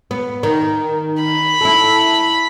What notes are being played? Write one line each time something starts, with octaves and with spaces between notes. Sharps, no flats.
B3
D#3
B5
A3 E4